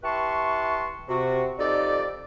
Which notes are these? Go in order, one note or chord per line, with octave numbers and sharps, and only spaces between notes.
E4 G4 B4 A5 C6 C#6
C3 F#4
F2 D#4 G4 A4 D5